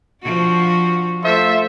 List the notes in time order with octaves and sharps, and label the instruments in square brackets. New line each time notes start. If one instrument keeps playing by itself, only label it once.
[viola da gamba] F3 D4 F#4
[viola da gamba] A3 A4 [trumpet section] F4 C5 E5